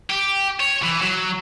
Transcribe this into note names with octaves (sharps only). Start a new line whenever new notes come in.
G4
C#5
E3
F#3